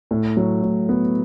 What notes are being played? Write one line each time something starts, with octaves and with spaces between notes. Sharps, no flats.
A2
F#3
A2
B3